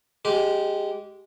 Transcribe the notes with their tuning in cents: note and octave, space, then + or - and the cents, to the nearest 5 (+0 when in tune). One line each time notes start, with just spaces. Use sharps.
G#3 +0 G4 -20